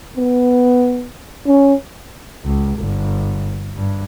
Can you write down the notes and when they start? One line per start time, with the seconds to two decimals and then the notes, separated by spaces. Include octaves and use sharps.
0.17 B3
1.47 C#4
2.44 C#2
2.79 G1
3.77 G2